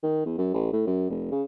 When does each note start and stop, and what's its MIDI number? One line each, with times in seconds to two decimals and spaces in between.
0.03 0.22 51
0.26 0.38 40
0.38 0.50 42
0.54 0.71 33
0.73 0.82 45
0.87 1.07 42
1.10 1.31 29
1.32 1.43 49